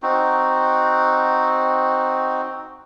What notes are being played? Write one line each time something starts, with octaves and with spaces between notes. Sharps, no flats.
C4 D#4 F#4